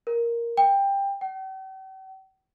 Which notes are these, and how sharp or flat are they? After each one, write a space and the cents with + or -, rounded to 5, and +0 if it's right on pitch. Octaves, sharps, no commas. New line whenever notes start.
A#4 +5
G5 +15
G5 -45